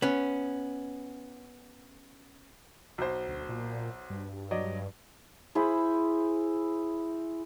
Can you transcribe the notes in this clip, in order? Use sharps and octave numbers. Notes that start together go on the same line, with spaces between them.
B3 C#4
B1 C5
D2
A#2
G2
F#3 D5 D#5
E4 G#4 C5 B5